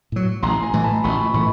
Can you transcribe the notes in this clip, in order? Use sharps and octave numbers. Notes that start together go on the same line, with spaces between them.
A2 F#3
A1 A#5 C6
G#5 A#5
A2 E3 A3
A5 B5
A1 B5 C#6
A2 E3 A3 B5 C#6